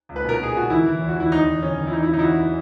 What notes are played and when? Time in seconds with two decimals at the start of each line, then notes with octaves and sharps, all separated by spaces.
0.09 C#2
0.16 B4
0.24 B2 A#4
0.40 B2 G#4
0.55 B2 F#4
0.70 E3 E4
0.86 E3
1.01 E2
1.09 F#4
1.17 E2 E4
1.32 E2 D#4
1.46 E2
1.62 D#3 C#4
1.78 D#3
1.87 E4
1.93 E2 D#4
2.03 E4
2.08 C#3
2.13 D#4
2.19 E4
2.24 E2 F#4
2.39 E3